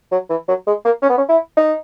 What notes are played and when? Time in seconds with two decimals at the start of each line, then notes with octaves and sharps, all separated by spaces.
0.12 F#3
0.30 E3
0.48 F#3
0.67 G#3
0.84 A#3
1.02 C#4
1.09 B3
1.17 C#4
1.29 E4
1.57 D#4